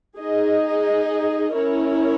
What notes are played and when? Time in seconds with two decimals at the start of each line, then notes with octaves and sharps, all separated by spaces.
0.18 D#4 G#4 D#5
1.53 C#4 E4 A#4 C#5